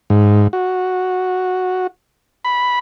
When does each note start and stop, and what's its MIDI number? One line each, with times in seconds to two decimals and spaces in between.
0.10 0.48 44
0.53 1.87 66
2.45 2.79 83